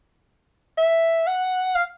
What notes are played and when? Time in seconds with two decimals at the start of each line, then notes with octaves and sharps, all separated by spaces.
0.78 E5
1.27 F#5
1.75 F5